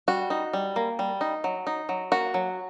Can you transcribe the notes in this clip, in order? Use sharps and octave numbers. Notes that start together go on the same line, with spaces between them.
G3 F#4
D#4
G3
A#3
G3
D#4
F#3
D#4
F#3
A#3 F#4
F#3